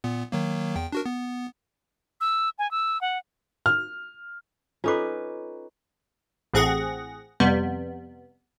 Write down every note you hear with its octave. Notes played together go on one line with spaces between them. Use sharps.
A#2 B3
D#3 F#3 A#3
E2 G5
D4 F#4 A#4
B3
E6
G#5
E6
F#5
F6
C#4 D#4 F4 A4 B4 D6
A1 A2 C4 G#4 F#5 A#6
F2 C3 G3 B3